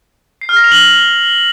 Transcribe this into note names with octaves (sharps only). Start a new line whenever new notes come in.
C7
F6
A#6
F7
F#7